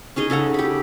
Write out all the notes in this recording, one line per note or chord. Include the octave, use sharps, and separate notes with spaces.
C#4 D#4 G#4 D#5
C#3 A4 F#5 A#5
G4 B5